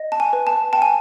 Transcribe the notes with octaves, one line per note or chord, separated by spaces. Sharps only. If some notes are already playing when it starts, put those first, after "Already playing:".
Already playing: D#5
A5
G#5
B4
A5
G5 A5
G#5